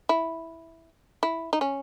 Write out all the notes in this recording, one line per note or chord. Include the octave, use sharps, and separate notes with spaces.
E4
E4
D#4
C#4